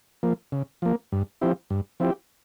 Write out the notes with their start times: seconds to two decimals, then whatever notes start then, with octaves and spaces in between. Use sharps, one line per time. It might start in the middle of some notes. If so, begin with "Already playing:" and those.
0.23 F3 A#3
0.52 C#3
0.82 F3 A#3
1.12 G2
1.41 F3 C4 E4 G4
1.70 G2
2.00 F3 C4 E4 G4